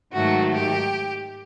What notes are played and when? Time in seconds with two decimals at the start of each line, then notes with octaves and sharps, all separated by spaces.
0.14 G#2 D#3 F#3 A3 F#4
0.54 G4